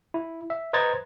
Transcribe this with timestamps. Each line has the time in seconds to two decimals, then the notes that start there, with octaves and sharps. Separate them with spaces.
0.14 E4
0.50 E5
0.73 B4 C5 D#5 A#5 G#6 A6